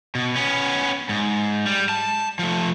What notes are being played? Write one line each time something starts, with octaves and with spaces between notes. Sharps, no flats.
B2
B3 C#4
G#2
G3
A5
F3 A3